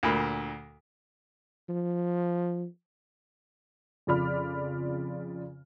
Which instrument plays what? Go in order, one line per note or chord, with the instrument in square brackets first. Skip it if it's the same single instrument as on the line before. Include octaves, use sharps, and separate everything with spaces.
[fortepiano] D2 A#2 B5
[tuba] F3
[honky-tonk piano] F2 C#3 F4 D5 B5 F6